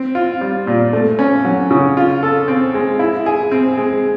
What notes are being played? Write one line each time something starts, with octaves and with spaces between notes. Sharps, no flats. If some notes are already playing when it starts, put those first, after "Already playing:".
Already playing: C4
F4
G3
A#2
A3
C#4
F#3
C#3
F4
A4
C4
G#3
E4
G#4
C4
G#3